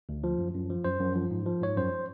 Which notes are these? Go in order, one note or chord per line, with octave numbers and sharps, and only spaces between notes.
D2
F3
F#2
F#2
F3
F#2 C5
F#2
F3
G#2
F3
G#2 C#5
F#2 C5